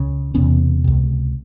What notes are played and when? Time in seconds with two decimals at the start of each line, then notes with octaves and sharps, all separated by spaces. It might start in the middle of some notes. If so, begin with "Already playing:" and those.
Already playing: C#2 C#3
0.34 E1 E2 C3 B3 C#4
0.84 C#2 C3